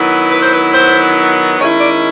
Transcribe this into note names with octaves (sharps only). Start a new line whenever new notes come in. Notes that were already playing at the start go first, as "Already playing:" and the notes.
Already playing: D#3 F#3 B3 E4
B4
C5
B4
C5
D#3 G#3 C#4 E4 C#5
D5